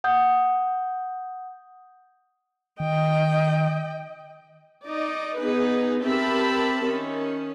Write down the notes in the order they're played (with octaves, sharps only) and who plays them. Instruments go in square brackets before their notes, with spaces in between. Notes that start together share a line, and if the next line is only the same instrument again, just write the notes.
[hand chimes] F#5 D#6 G6
[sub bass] D#3 [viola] D#5 G5
[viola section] D#4 D5 D#5
B3 D#4 G#4 B4
C4 G4 A#4 E5 A5 B5
D#3 C#4